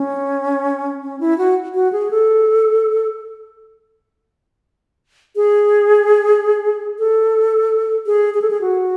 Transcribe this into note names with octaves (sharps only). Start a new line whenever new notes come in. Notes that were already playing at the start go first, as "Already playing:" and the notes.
Already playing: C#4
C#4
E4
F#4
F#4
G#4
A4
G#4
A4
G#4
G#4
A4
G#4
F#4